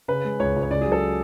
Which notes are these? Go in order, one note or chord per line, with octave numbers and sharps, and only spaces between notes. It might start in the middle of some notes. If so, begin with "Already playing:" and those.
C#3 B4
G#3
C#2 C#5
C#2
C#5
C#3 D5
F#3 G#4
A4